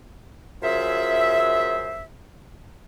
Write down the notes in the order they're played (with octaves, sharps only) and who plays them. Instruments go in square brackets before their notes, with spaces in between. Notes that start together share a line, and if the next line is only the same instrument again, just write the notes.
[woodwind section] F#2 F4 G#4 C5 E5